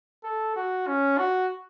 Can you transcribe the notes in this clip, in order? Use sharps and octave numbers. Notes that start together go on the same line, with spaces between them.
A4
F#4
C#4
F#4